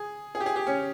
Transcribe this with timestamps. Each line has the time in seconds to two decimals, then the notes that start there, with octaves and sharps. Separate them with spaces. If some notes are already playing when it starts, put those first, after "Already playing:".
Already playing: G#4
0.35 G#4
0.40 G4
0.46 G#4
0.56 G4
0.67 C#4